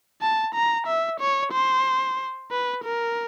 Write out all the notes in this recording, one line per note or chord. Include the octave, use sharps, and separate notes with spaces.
A5
A#5
E5
C#5
C5
B4
A#4